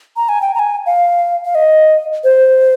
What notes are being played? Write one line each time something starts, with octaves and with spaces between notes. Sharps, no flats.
A#5
G#5
G5
A#5
G#5
F5
F5
D#5
C5